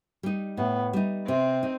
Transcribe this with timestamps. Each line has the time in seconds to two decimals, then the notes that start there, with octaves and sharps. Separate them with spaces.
0.23 G3 D#4
0.57 A2 B3
0.93 G3 D#4
1.28 C3 C4
1.63 D#4